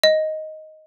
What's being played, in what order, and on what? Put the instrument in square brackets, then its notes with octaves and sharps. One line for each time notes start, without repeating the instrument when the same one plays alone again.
[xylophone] D#5